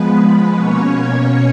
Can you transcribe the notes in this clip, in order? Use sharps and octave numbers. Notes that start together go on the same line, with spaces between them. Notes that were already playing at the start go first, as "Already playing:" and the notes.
Already playing: F3 G#3 B3 B4
B4
B2 A#3 C#4 C#5
C#5